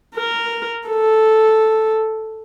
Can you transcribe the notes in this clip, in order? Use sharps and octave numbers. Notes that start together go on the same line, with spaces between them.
A#4
A4